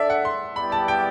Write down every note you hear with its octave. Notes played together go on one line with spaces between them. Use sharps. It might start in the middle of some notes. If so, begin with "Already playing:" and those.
Already playing: D4 A4 D5 E5
F#5
C6
G3 B3 E4 G4 D5 B5
A5
G5